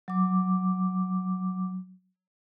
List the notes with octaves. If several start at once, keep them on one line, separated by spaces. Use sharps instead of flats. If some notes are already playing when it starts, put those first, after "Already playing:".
F#3 D6